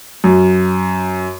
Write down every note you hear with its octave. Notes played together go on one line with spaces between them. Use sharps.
F#2